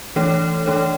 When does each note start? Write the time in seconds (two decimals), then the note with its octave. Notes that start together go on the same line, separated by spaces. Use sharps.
0.16 E3 A3 D4 A4 C#5
0.66 E3 A3 D4 A4 C#5